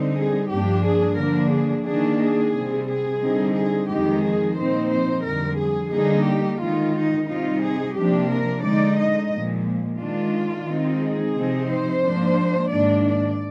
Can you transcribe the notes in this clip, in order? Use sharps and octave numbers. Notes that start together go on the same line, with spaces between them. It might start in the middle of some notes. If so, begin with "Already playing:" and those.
Already playing: D3 G3 C4 D#4
G#4
G2 F3 A#3 D4 G4
G#4
D3 F3 A#3 D4 A#4
G#4
D#3 A#3 D4 G#4
G#4
C3 G3 C4
G#4
D3 G3 C4 D#4
G#4
F2 D#3 G#3 D#4 G4
G#4
A#2 F3 C4 D#4 C5
C5
F2 D3 G3 A#4
G#4
D3 G3 A#3 D#4 G#4
G4
D#3 G#3 D#4 F4
D#4
C3 G3 C4 D#4 F4
G#4
C3 F3 A#3 D4 G4
A#4
D3 G#3 D#4 D5
D#5
A#2 F3 G#3
D#3 G#3 D4 F4
D#3 G#3 C4 D#4
G#4
C3 F3 C4 D#4
C5
G#2 F3 A#3 D4
G#2 D#3 A#3 D4 D5
D5